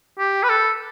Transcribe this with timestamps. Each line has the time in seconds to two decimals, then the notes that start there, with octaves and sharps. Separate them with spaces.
0.19 G4
0.43 B4
0.49 A4